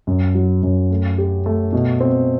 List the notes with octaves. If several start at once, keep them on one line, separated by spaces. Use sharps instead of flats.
F#2
F#3
F#2
A3
G4
A3
B2
C4